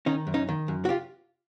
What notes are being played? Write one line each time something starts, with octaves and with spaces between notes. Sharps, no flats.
D#3 C#4 D#4
F#2
C#4 D#4
D#3
F#2
F#4
F4 G4